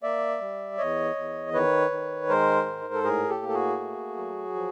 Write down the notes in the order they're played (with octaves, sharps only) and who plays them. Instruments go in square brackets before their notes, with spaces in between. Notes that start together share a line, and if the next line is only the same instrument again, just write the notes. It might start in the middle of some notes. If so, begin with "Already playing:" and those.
[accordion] A#3 D5 E5
G3
E2 C#5 D#5
E2
D#3 B4 C#5
D#3
G#3 A#4 C5
G#2
A4
A2 G#4 A#4
G4 A4
A#3
A4
F#4 G#4
A3
F#3
F3